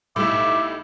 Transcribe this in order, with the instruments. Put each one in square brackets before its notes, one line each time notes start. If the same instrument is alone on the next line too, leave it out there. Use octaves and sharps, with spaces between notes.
[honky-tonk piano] B1 A2 [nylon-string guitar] G3 A3 D#4 [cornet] E5 [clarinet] D6